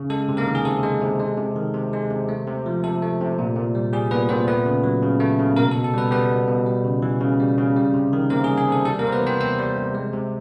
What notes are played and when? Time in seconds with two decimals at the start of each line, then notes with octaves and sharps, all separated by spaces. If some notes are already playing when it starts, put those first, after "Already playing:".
Already playing: C#3
0.10 G#3 A4
0.29 C3
0.37 A#3 A#4
0.46 D#3
0.55 G#4
0.65 C3 A4
0.83 G#3
1.01 C3
1.19 G#3
1.37 C3
1.56 D#3
1.74 C3
1.93 G#3
2.11 C3
2.29 A3
2.47 C3
2.66 F3
2.84 C3 A4
3.02 A3
3.20 C3
3.39 A#2
3.56 A#2
3.75 G3
3.93 G3 G#4
4.11 A#2 B3 B4
4.29 A#2 C4 C5
4.48 A3 B3 B4
4.66 C#3
4.84 F#3
5.03 C#3
5.20 A3
5.39 C#3
5.56 B2 A#3 A#4
5.71 A4
5.75 B2
5.84 A4
5.94 G3 B3 B4
6.11 G3 B3 B4
6.30 B2
6.48 B2
6.66 G3
6.84 C#3
7.02 E3
7.21 C#3
7.40 G3
7.58 C#3
7.76 G3
7.94 C3
8.13 D#3
8.30 C3 A#3 A#4
8.44 G#4
8.49 G3
8.58 G#4
8.68 C3 A4
8.85 G3 A4
8.99 A#3 A#4
9.03 C3 C5
9.12 B3 B4
9.21 E3
9.27 C4 C5
9.40 C3 C4 C5
9.59 G3
9.77 C3
9.94 G#3
10.13 C3